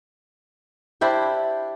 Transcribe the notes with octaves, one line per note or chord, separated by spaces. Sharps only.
D4 E4 G4 C5